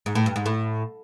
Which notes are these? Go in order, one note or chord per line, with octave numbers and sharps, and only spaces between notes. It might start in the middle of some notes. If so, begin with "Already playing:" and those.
G#2
A2
G2
G#2
A2